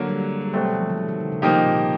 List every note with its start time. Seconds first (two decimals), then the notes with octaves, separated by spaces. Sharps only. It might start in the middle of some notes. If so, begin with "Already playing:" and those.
Already playing: D3 F#3 A#3
0.09 G3
0.20 G#3
0.30 G#3
0.41 G3
0.53 B2 F#3 G3 A3 C4
0.75 F3
0.90 D#3
0.97 E3
1.09 D#3
1.20 D3
1.32 C#3
1.42 C3 F3 A#3 D#4 G4
1.65 A#2